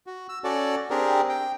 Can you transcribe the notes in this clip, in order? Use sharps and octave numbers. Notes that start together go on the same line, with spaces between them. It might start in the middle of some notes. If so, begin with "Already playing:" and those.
F#4
E6
C#4 F#4 A4 D5
C4 D4 G4 G#4 A#4
G5